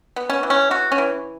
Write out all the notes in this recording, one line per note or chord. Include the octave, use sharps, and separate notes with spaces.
B3
C#4
E3
C#4
E3 F#4
C#4
E3